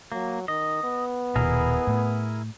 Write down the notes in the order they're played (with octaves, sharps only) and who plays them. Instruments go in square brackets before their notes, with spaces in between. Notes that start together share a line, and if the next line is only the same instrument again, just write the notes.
[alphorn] F#3 [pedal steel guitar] A#3
[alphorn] D#3 [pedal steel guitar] D#5
[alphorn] B3
[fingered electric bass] D#1 B2 [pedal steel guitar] E4 G#4 A#4
[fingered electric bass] A2